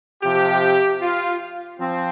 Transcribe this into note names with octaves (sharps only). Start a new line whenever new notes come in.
C3 F3 G4
F4
F3 C4